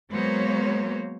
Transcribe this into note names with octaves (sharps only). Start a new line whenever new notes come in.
F#3 G#3 A#3 B3 C5 C#5